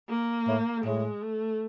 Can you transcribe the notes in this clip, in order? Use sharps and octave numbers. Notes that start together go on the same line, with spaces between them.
A#3
A2
A2 G#3
A3